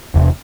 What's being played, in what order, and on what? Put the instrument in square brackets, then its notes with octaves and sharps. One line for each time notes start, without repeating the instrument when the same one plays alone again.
[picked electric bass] E1 E2 C3